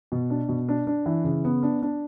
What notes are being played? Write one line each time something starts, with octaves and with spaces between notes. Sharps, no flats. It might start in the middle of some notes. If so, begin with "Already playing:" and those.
B2
D4
B2
D4
D4
E3
C#3
B3
D4
D4